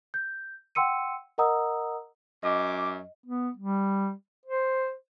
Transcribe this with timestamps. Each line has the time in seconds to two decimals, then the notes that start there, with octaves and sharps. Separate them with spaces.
0.14 G6
0.75 F#5 G5 C6 E6 C#7 D#7
1.38 A#4 D#5 F#5 A#5 D#6 E6
2.43 F#2 D#5 D6
3.26 B3
3.57 G3
4.46 C5